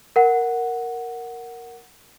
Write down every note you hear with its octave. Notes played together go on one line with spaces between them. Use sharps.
A#4 F#5